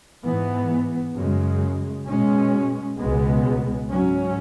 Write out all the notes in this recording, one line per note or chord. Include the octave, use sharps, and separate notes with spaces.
G#2 E3 B3
F#2 C#3 G#3
B2 G#3 C#4
C#2 B2 G#3 B3
G#2 F#3 C#4